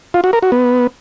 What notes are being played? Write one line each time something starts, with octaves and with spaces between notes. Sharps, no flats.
F4
F#4
A#4
F#4
B3